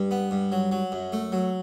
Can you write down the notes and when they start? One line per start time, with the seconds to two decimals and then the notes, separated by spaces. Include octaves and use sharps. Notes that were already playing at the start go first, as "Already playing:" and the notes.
Already playing: G2
0.11 B3
0.31 G2
0.52 F#3
0.72 F#3
0.92 F#2
1.12 A3
1.32 F#3